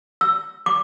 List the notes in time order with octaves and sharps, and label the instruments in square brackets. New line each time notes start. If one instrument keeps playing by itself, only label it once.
[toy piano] E6
D6